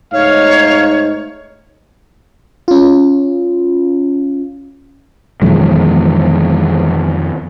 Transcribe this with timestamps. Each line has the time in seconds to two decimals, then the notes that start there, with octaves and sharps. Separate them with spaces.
0.13 G#2 A3 D#4 C#5 F5
2.68 C#4 F4
5.42 F2 B2 D#3 E3 F#3 G#3